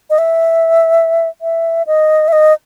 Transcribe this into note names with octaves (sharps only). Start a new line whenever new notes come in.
D#5
E5
E5
D#5
E5
D#5